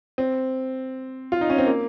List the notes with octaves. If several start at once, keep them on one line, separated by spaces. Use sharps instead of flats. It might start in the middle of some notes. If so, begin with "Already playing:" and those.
C4
F4
D#4
C#4
C4
A#3